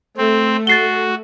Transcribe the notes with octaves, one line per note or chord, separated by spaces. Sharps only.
A3 C4
F#4 A6 C7 G7